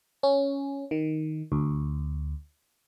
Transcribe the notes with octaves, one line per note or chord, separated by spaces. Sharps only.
C#4
D#3
D2